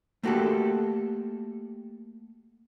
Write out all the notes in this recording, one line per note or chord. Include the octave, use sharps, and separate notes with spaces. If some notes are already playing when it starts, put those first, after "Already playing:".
A3 A#3 F#4 G4 A4